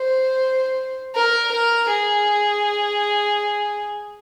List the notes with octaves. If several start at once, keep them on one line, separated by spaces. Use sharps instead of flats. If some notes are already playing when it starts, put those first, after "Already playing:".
Already playing: C5
A#4
A#4
G#4